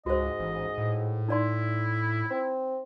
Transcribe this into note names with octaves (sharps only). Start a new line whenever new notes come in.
C#2 G#2 F#4 C5 D#5
A1
A2
D#4 E4 D5 C6
C4